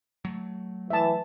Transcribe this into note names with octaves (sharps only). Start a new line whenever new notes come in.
F#3 A3
E3 E5 A5